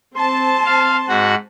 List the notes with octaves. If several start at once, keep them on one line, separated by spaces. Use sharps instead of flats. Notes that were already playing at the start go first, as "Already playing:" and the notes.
C4 A5 C6
F5
G#2 F#4 F#5